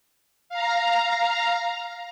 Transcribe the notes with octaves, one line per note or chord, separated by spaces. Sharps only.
F5 A#5